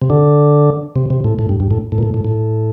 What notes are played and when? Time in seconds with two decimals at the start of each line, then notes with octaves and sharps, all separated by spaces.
0.02 C3
0.10 D3
0.96 C3
1.10 C3
1.24 A2
1.39 A2
1.49 G2
1.60 G2
1.71 A2
1.92 A2
1.98 A#2
2.03 A2
2.14 A2
2.25 A2